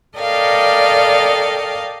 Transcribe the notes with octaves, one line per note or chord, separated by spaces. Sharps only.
A4 A#4 D5 D#5 F5 G5